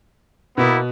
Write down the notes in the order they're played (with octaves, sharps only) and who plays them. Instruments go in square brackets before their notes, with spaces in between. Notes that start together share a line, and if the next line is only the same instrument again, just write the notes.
[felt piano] B2 [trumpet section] A#3 B3 E4